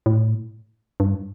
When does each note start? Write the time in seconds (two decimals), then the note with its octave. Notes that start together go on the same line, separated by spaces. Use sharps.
0.06 A2
1.00 G2